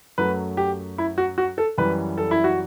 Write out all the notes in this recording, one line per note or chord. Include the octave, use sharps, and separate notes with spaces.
F#2 F#3 A3 B4
G4
E4
F#4
F#4
A4
F#2 E3 G3 B4
A4
E4
F#4